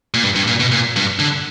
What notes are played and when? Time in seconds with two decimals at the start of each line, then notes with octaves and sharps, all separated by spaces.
0.14 A#2
0.23 G2
0.36 G2
0.48 A#2
0.60 B2
0.72 A#2
0.96 G2
1.19 D3